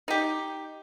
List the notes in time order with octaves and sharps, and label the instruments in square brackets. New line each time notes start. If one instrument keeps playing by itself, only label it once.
[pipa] D#4 G4